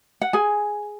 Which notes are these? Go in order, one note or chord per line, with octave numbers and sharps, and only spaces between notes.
F#5
G#4 G#5